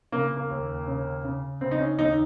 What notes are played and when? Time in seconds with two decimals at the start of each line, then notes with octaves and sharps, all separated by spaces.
0.12 C#3 A#3
0.37 A#3
0.50 D#2
0.88 C#3
1.24 C#3
1.61 C#3 C4
1.71 D#4
1.80 C#4
1.98 D#2 D#4